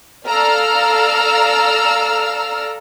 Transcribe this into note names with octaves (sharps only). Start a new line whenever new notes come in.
A4 D5 F5 A#5 E6 F6